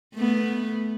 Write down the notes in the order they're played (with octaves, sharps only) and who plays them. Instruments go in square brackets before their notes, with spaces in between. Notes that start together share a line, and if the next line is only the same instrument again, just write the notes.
[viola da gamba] A3 B3